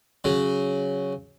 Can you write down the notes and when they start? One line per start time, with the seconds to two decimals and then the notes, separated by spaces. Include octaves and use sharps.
0.24 C#3 F#3